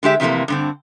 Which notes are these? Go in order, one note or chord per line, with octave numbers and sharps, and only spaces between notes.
D3 G#3 G4 E5
F2 C3 E3 A3 A#3
G2 D3 C4